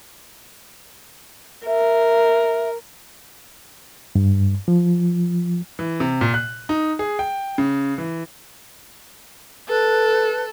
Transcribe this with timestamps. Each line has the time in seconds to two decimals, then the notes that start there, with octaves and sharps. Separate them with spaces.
1.66 A#4 E5
4.15 G2
4.68 F3
5.79 E3
6.00 C3
6.21 A#2
6.34 F#6
6.69 D#4
6.99 G#4
7.19 G5
7.58 C#3
7.98 E3
9.69 A4 B4